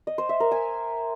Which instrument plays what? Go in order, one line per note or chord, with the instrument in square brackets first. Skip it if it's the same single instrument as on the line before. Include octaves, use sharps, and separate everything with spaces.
[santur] D#5
C5
E5
A#4
G#5